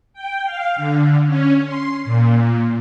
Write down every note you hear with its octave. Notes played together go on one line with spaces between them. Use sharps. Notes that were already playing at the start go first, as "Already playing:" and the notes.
G5
F5
D3
C#4
C6
A#2